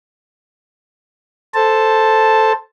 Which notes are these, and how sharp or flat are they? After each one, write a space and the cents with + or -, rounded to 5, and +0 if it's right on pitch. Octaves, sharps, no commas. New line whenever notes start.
A4 +0 C5 +0 A5 +0